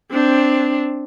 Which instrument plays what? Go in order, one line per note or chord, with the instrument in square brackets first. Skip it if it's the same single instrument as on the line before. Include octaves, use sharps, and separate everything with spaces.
[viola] C4 D4